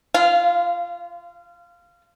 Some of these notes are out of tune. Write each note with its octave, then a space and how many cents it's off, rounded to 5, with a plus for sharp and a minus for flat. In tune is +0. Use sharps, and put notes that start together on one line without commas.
F4 -25 F5 +0